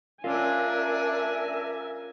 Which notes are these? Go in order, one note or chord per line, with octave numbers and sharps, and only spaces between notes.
C#4 D4 F4 A#4 E5 G#5